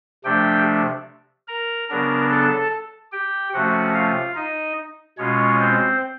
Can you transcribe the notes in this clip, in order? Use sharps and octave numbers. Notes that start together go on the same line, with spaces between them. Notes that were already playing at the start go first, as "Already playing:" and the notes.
C3 F3 A3 D4 G4 G5
A#4 A#5
C#3 F#3 B3 D4 A#4 A#5
A4 A5
G4 G5
C3 F3 A3 C#4 F#4 F#5
F4 F5
D#4 D#5
B2 G#3 C#4 F4 C#5
C4 C5